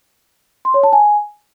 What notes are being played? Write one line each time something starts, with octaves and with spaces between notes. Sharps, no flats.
C6
C#5
A5
G#5